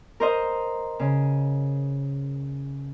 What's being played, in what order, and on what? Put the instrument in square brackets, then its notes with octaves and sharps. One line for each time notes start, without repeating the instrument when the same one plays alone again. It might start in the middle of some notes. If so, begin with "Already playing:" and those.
[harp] A#4 C5 D#5
C#3